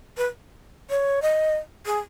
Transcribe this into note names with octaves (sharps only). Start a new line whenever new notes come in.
B4
C#5
D#5
G#4